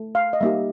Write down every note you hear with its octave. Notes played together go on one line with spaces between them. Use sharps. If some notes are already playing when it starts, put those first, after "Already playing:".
Already playing: A3
F5
D#5
G3 A#3 D#4 G4 E5